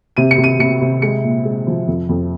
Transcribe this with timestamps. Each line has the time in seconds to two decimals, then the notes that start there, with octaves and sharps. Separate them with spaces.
0.17 C3 D#7
0.31 C#7
0.38 C3
0.44 D#7
0.59 C3 C#7
0.81 C3
1.02 G#3 C#7
1.23 A#2
1.45 G#3
1.67 F3
1.87 F2
2.09 F2